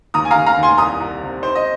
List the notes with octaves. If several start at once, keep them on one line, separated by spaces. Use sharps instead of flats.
D#2 A#5 D#6
G#5
D#2 F5 A#5
F5 A#5
D#2
G#5 C6
C2 A#5 D#6
C2
C3
D#4 C5
D#5